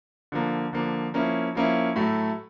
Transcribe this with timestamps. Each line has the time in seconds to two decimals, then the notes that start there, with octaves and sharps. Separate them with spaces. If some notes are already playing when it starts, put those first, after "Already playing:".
0.32 D3 F3 A#3
0.73 D3 F3 A#3
1.14 F3 A#3 C#4 E4
1.55 F3 A#3 C#4 E4
1.96 A2 F#3 A3